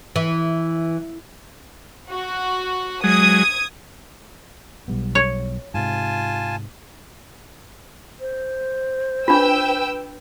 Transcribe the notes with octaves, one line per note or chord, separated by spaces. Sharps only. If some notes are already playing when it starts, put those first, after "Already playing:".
E3
F#4
F#3 G#3 D#6 G#6
B1 G3 B3
C#5
G#2 C3 F4 G#5 A5
C5
D4 F4 B4 G5 E6